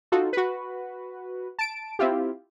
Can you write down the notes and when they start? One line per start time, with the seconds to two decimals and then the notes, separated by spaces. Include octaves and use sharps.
0.12 D#4 F4 F#4 A4
0.33 F#4 B4
1.59 A5 D7
1.99 C4 E4 F4 G4